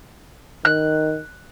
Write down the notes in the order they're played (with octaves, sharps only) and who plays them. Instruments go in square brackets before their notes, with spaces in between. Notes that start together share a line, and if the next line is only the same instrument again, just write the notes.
[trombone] D#3 [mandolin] F#6